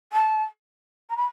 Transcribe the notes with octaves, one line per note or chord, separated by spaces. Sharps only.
A5
A#5
B5